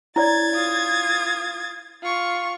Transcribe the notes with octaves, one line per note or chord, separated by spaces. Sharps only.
E4 C#5 D5 G#6 A6
F4 D#6
F4 C#6